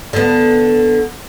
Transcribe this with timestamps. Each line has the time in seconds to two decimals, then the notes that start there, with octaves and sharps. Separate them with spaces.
0.13 D3 B3